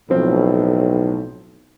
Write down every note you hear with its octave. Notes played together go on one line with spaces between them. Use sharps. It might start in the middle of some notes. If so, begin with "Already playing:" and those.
B1 A2 F3 C4